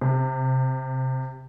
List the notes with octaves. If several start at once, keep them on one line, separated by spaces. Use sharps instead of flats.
C3